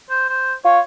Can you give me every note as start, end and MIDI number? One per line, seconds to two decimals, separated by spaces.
0.10 0.28 72
0.29 0.53 72
0.65 0.81 65
0.65 0.80 73